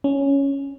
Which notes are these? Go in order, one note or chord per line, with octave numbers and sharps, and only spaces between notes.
C#4